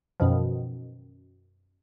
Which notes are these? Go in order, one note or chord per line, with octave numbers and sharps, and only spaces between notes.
F#2 B2 D#3 F3